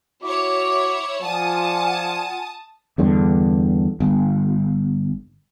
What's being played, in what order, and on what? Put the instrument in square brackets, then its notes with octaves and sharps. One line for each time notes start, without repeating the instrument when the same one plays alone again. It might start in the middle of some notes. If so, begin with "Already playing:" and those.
[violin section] E4 C#5 [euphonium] F#4 [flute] D6
[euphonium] F3 [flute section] F4 F#5 G#5 [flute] D5 [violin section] A5 D#6
[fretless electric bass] E2 G2 D3
G1